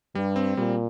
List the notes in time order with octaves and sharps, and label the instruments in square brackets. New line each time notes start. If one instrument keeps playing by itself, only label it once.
[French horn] G2 [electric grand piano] G3
[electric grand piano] C4
[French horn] A#2 [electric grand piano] G3